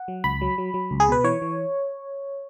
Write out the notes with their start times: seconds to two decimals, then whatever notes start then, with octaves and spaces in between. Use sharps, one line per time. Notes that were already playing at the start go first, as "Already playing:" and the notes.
Already playing: F#5
0.08 F#3
0.24 C#2 B5
0.41 F#3
0.58 F#3
0.74 F#3
0.91 C#2
1.00 G#4
1.09 B2 B4
1.24 E3 C#5
1.42 E3